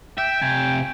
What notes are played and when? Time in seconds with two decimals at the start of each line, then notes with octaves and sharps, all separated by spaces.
0.18 E5 G5
0.42 C3 G#5